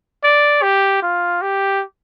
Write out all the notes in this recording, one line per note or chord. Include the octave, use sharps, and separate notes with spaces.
D5
G4
F4
G4